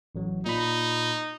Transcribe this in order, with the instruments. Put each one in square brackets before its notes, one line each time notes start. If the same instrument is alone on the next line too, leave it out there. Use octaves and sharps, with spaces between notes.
[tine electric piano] A1 F#3
[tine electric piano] A#2 B5 [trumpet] D#4